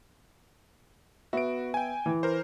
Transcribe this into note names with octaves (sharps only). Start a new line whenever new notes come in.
B3 F#4 E5 D7
G5 G#5
E3
A#4 C5